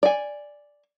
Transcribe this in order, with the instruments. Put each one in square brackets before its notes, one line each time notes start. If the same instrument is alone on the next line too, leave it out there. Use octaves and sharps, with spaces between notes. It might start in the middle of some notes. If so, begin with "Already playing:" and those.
[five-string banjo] D5 G#5